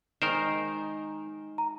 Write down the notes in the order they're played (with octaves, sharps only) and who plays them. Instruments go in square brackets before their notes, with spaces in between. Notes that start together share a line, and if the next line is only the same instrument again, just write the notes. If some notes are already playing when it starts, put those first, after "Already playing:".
[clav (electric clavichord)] D#3 A#4 C5 [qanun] G#3 D#4
[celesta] A#5